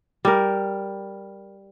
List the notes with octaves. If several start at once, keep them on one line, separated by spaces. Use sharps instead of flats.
G3 A#4